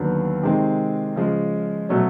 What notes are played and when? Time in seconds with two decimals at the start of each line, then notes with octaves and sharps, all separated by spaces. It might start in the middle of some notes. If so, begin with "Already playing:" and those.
Already playing: D#2 D3 F#3 B3
0.43 C3 D#3 G#3 C4
1.16 C#3 F3 G#3
1.89 B2 F#3 A3 C#4